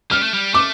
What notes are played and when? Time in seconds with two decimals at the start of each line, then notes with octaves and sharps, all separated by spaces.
0.11 G3 F6
0.22 A3
0.34 G3
0.54 A3 D6